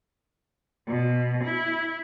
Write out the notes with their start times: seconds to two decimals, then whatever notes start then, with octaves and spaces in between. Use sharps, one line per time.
0.88 B2
1.44 E4